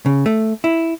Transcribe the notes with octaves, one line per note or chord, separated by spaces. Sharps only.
C#3
A3
E4